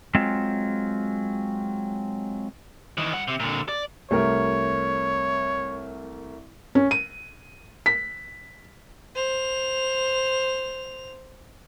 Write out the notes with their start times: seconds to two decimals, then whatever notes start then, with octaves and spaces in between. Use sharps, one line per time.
0.15 F#3 G#3 C4 F4
2.98 D#3 E3
3.13 G2 F#5
3.28 C3
3.40 A#2 D3
3.69 D5
4.11 C2 A3 A#4 C#5
6.75 C#4
6.91 D#7
7.86 B6
9.15 C5 F7